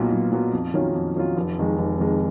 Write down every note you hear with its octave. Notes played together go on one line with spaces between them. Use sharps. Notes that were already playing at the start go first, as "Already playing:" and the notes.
Already playing: B1 A#2 F#3 B3 F4
B1
A#2 F#3 B3 F4
F2
D#3 F#3 C#4 F4
F2
D#3 F#3 C#4 F4
F1
F2 D#3 G#3
F1
F2 D#3 G#3